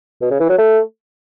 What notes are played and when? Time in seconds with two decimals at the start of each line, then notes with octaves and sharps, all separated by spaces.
0.21 B2
0.30 C#3
0.40 E3
0.49 F#3
0.58 A3